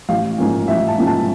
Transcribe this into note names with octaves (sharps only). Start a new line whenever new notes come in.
A1 F5
G#2 F3 A#3 C#4
A1 E5
A5
G#2 F3 A#3 C#4
A5